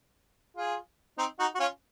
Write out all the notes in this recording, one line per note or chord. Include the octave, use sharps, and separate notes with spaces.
F4 G#4
C4 D#4
D#4 F#4
F#4
C#4 F4